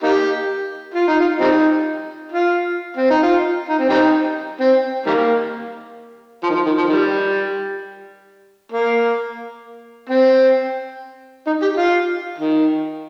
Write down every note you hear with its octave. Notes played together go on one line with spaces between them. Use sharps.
A#3 D#4 G4
F4
D#4
F4
G3 C4 D#4
F4
C4
D#4
F4
D#4
C4
G3 C4 D#4
C4
D#3 G3 A#3
F3
D#3
F3
D#3
F3
D#3 G3
A#3
C4
D#4
G4
F4
D#3